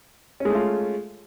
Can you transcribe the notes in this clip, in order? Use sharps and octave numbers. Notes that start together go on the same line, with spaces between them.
G#3 A3 C#4 F4